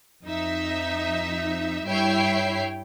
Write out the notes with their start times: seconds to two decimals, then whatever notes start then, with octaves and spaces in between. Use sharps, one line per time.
0.23 F2 D#4 E5
1.87 G2 E4 C#5 E5 G5 C7